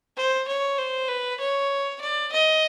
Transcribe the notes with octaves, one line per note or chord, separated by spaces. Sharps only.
C5
C#5
C5
B4
C#5
D5
D#5